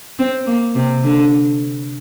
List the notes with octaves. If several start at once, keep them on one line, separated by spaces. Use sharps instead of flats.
C4
A#3
C3
D3